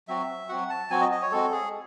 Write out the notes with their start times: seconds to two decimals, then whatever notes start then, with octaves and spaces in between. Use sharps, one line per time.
0.08 F#3 C4 F#4 E5
0.49 F#3 C4 F#4 F#5
0.70 A5
0.90 F#3 C4 F#4 G#5
1.01 D#5
1.12 D#5
1.22 C#5
1.32 G#3 C4 F#4 A4
1.52 G#4